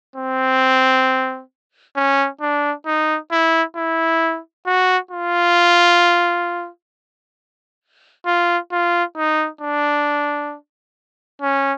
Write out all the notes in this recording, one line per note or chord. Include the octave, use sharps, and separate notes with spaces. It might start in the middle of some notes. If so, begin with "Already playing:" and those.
C4
C#4
D4
D#4
E4
E4
F#4
F4
F4
F4
D#4
D4
C#4